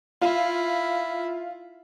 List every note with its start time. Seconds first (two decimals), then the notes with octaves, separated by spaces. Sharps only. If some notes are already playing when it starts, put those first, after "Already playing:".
0.21 E4 F4